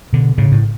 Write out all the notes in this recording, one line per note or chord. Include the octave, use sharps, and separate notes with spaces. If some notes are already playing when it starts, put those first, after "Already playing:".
B2 D3
A2 C#3
A2